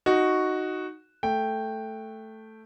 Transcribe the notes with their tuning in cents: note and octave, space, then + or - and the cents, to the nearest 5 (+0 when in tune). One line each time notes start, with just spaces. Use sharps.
D#4 +0 F#4 +0
A3 +0 G5 +0